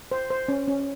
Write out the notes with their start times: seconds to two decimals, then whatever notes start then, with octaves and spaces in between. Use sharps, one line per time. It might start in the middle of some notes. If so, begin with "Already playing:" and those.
0.11 C5
0.30 C5
0.48 C#4
0.68 C#4